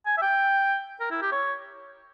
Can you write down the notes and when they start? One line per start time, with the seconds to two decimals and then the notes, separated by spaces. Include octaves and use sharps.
0.06 G#5
0.18 E5
0.22 G5
1.00 A#4
1.11 E4
1.22 G4
1.32 C#5